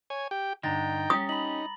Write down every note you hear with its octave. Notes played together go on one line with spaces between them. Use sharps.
C#5 G#5
G4 G5
G2 D3 D#4 G5 A#5 A6 A#6
C#4 G4 D#6
D#4 B5 F#7